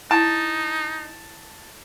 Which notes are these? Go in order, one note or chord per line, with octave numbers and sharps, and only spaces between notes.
D#4 E4 A5